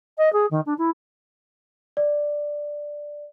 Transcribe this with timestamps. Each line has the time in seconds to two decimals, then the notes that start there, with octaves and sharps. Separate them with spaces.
0.17 D#5
0.32 G#4
0.50 D#3
0.66 D4
0.78 E4
1.97 D5